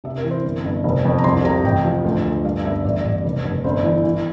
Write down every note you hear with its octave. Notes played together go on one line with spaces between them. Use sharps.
C3 E5
A#4
E3
C5
G1
G1
F1
F2
A#5
C2 C6
C3 A#5
A1 G5
F3
D2
D2
G2 F5
G1 E5
A1 D5
A1
F1
F1
G1 C5
E3
E3